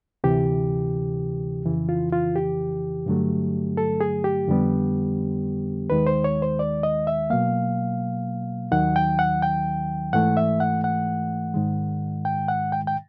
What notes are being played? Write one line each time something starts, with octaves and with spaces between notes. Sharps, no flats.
D2 C3 E3 G4
F2 C#3 E3
F4
F4
G4
G2 D3 F#3 A3
A4
G#4
G4
F2 D3 G3 B3
D#2 D#3 G#3 B4
C5
C#5
C5
D5
D#5
E5
B2 F#3 A#3 F5
D#2 D#3 F#3 F#5
G5
F#5
G5
G#2 E3 A3 F#5
E5
F#5
F#5
G#2 D#3 G#3
G5
F#5
G5
G5